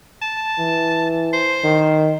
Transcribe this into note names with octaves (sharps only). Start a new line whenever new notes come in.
A5
E3
C5
D#3